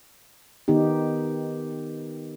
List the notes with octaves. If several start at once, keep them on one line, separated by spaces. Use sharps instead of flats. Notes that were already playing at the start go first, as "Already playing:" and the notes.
D#3 B3 D#4 G4